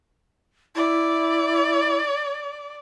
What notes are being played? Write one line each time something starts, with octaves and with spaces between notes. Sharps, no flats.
E4 D5